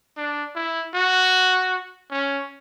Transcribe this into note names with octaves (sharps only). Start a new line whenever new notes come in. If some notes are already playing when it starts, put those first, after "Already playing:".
D4
E4
F#4
C#4